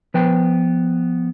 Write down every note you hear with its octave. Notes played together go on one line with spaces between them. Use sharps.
F3 B3 B4 G5